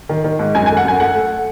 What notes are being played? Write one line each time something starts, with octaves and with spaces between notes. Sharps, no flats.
D#3
D#3
G#2
F#2 G#5
G#5
A3
F#5
F#2 G#5
A3 F#5
A3